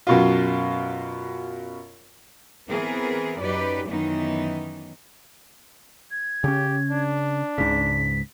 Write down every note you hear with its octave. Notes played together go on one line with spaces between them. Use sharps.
F#2 B2 F4
E3 B3 C4 G#4 A#4
F#2 D#4 G4 B4 D5
F#2 D#3 E3 B3 D#4
G#6
C#3 C#4 G4
D4
C#2 G#2 C#3 B6